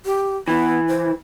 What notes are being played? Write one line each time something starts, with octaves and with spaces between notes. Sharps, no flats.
G4
E3 B3
C5